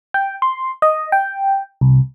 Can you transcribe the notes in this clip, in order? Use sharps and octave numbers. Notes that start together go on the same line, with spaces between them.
G5
C6
D#5
G5
C2